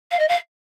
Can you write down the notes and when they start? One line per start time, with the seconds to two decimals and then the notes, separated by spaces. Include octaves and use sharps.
0.12 F5
0.19 D#5
0.29 F5